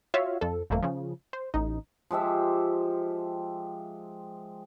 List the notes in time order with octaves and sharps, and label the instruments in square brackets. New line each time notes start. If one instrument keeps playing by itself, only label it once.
[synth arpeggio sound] F4 F#4 C#5 E5 F5
F2 A4
G1 F2 A3 A#3
C#3 F3
C5
A1 D#4
[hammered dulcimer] F3 G#3 G4 E5